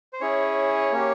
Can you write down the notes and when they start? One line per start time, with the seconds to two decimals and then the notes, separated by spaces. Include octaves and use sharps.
0.13 C5
0.20 C#4 E4 G#4 C#5
0.92 A#3 C#4 G4